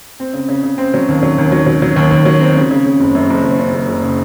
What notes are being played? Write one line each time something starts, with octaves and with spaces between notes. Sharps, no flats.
C4
C#3
C#3
C#3
C4
F#3
D#2
F#3
D#2
F#3
F#3
F#3
D#2
D#2
F#3
C4
C#3
C#3
C#3
F#1
F#2
F#1
F#1
C#3
F#1
F#1
C#3